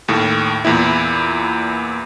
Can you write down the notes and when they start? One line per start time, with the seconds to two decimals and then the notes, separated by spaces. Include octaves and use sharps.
0.08 D#2 A2
0.65 E2 A#2 E4